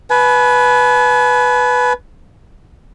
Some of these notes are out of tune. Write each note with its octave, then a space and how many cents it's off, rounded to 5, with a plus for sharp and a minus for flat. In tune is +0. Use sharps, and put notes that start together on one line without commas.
B4 +0 G#5 +45